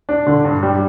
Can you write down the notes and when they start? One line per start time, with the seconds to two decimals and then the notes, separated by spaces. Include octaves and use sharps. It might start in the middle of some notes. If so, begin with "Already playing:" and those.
0.09 D4
0.27 D3
0.45 G2
0.63 G3